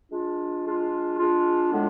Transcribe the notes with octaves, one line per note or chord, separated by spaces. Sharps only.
G#3 D4 F4
G#3 D4 F4
G#3 D4 F4
A2 G#3 B3 D4 F4